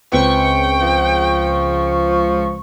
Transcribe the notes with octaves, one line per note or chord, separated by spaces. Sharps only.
C#2 C4 B4 G5 C#6
F3